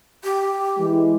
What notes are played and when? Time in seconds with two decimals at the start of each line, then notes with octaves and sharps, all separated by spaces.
0.24 G4
0.77 E3 G#3